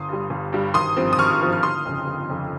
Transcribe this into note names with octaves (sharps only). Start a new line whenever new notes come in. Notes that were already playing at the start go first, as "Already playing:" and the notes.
Already playing: G1 C6 D#6
G2 G3
G1
G2 G3
G#1 C6 D#6
G2 F3 C4
D#6
G#1 C#6 F6
G2 F3 C4
F6
G1 C6 D#6
F2 C#3
G1
F2 C#3